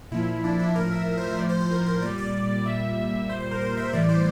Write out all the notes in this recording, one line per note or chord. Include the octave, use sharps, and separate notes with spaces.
A#2 F3 E4
D4
E4
A2 F3 A#4
E5
C5
C5
A2 F3 D5
C5
C5
A#4
A#4
A#2 G3 D5
D5
A#2 G3 E5
A#2 G3 C5
C5
A#4
C5
E5
A2 E3 G3 D5
C5